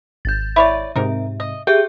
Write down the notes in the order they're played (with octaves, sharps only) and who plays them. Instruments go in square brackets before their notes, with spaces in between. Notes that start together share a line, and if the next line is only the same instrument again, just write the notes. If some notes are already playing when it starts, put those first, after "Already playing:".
[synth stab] G#1 [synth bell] G6 A6
[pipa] E4 C#5 D5 [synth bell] E5
[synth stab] G#2 C3 [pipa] D#4 A#4
[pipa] D#5
[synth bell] G4 G#4 E5 [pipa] G5